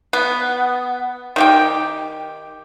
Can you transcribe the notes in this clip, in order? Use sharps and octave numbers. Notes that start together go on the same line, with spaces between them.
B3
D#3 G4 G5